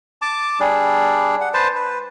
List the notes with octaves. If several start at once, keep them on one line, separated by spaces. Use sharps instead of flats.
A5 D6
G3 D4 G#4
F#5
B4 C5 A5
B4